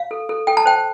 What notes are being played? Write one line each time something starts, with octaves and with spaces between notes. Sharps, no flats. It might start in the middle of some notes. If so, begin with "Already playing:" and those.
Already playing: F5
A4
A4
A4 G5
A5
C5 G5